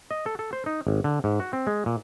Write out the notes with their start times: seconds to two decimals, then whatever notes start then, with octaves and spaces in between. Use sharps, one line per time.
0.11 D#5
0.26 A4
0.39 A4
0.53 C5
0.66 D#4
0.87 G#1
1.04 D3
1.24 G#2
1.40 F#4
1.53 C4
1.67 G#3
1.86 A#2